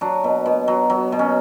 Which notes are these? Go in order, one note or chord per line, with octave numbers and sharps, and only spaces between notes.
F#3 D4
B2
B2
F#3
F#3
B2
C#4